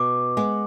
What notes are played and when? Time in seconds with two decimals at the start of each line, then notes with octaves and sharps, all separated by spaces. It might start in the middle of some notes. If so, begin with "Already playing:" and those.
Already playing: B2 D6
0.37 G#3 B3